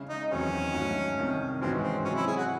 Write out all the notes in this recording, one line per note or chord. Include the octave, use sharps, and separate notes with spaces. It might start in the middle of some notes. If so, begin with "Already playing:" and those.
Already playing: C#3 G#3 C#4 E4 G#4
D#4
E2 D#3 F#3 C4 C#4 E4
G#2 F#3 A3
C2 C3 D#3
G#2 E3 G#3 C4 C#4 F#4
C4
C3 F#3 C4 C#4
E4
G#4
F#4